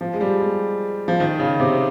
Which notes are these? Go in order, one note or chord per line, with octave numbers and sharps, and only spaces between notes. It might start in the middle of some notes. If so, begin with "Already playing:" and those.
F3
G#3
G3
G#3
F3
D#3
C#3
C3